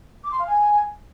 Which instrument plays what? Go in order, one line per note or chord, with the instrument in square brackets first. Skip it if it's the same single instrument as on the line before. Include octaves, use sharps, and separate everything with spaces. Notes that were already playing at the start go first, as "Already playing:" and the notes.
[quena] D6
C6
F5
G#5